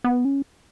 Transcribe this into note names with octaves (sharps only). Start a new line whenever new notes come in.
B3
C#4